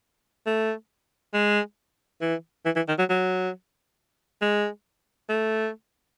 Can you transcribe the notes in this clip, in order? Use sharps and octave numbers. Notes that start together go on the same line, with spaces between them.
A3
G#3
E3
E3
E3
D#3
F#3
F#3
G#3
A3